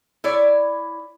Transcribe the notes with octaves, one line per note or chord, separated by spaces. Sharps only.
E4 C#5 D5